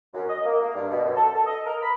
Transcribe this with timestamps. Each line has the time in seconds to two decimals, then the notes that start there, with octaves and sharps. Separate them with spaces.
0.14 F#2
0.29 D#5
0.45 A#3
0.61 A#3
0.75 G2
0.90 B2
1.04 F#2
1.16 A4
1.35 A4
1.46 D#5
1.66 A#4
1.82 B5